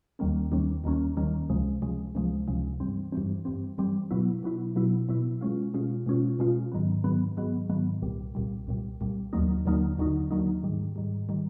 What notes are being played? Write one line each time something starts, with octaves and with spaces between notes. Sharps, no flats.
D#2 D#3 G3 A#3 C#4
D#2 D#3 G3 A#3 C#4
D#2 D#3 G3 A#3 C#4
D#2 D#3 G3 A#3 C#4
C#2 C3 F3 G#3
C#2 C3 F3 G#3
C#2 C3 F3 G#3
C#2 C3 F3 G#3
G2 E3 G3 C4
G2 E3 G3 C4
G2 E3 G3 C4
G2 E3 G3 C4
B2 F#3 B3 E4
B2 F#3 B3 E4
B2 F#3 B3 E4
B2 F#3 B3 E4
B2 G#3 C#4 F4
B2 G#3 C#4 F4
B2 G#3 C#4 F4
B2 G#3 C#4 F4
G#2 D#3 F#3 B3
G#2 D#3 F#3 B3
G#2 D#3 F#3 B3
G#2 D#3 F#3 B3
C2 A#2 G3
C2 A#2 G3
C2 A#2 G3
C2 A#2 G3
D#2 D3 F#3 A#3 D#4
D#2 D3 F#3 A#3 D#4
D#2 D3 F#3 A#3 D#4
D#2 D3 F#3 A#3 D#4
G#2 D#3 G3
G#2 D#3 G3
D#3 G3